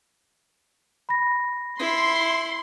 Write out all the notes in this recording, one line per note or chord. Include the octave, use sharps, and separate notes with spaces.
B5 A#6
E4 C6